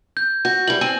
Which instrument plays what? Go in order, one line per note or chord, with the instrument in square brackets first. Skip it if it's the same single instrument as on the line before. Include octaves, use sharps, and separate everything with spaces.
[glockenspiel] G6
[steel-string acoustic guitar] F#4 [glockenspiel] G6
[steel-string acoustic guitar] E3 G3 [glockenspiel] F#7
[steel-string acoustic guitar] C4 G#5